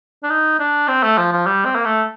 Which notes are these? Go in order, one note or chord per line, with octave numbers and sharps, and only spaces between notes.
D4
D#4
D4
C4
A3
F3
F3
G3
C4
A#3
A3